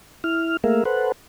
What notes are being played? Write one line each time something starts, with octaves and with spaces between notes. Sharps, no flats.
E4 F6
A3 A#3 G#4 A#4 E5 F5
A4 B4 C5 F#5